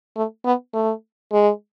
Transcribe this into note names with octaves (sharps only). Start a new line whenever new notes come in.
A3
B3
A3
G#3